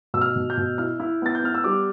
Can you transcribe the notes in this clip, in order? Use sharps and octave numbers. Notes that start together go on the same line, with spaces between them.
B2 E6
F6
B2
G6
B2
E4 F6
E4
B3 A6
G6
B3 F6
E6
G3 D6